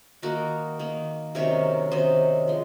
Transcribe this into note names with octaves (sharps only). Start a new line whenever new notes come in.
D#3 A#3 D#4 F#4 A#4
D#3 A#3 D#4
C3 D#3 F#3 C#4 A#4 C#5
C3 D#3 F#3 C#4 C5 D#5
F3 G#3